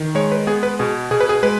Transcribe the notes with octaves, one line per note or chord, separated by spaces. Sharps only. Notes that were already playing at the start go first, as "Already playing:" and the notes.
Already playing: D#3
G#3 C#5
B4
B3 G#4
B4
B2 G#4
B2 G#4
B4
G#4
G#3 B4